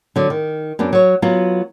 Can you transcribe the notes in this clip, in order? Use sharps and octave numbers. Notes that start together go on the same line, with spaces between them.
D3 F#3
D#3
F#2 B3 D4
F#3 C#5
F#3 B3 F4